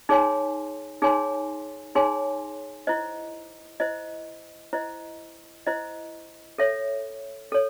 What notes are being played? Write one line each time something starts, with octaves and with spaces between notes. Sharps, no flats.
D#4 G#4 C#5 G#5 C6
D#4 G#4 C#5 G#5 C6
D#4 G#4 C#5 G#5 C6
E4 C5 D#5
E4 C5 D#5
E4 C5 D#5
E4 C5 D#5
A4 C#5 E5
A4 C#5